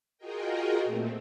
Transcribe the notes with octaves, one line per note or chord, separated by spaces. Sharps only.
F4 F#4 G#4 A#4 D#5 G5
A#2 A3 C4